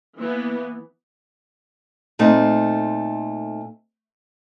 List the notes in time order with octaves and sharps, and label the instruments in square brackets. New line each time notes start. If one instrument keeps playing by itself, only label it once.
[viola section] E3 B3 [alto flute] A#3
[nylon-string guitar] A#2 A3 C4 D#4